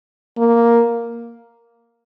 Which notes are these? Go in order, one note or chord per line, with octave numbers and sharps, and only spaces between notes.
A#3